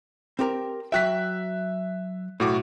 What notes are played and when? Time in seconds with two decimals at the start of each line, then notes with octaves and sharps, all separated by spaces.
0.39 C4 G4 A#4
0.92 F#3 F#4 E5 G5 F#6 B6
2.40 B1 A2 F#4 D6